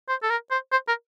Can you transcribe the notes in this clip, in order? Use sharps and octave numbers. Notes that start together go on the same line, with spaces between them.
C5
A4
A#4
C5
C5
A#4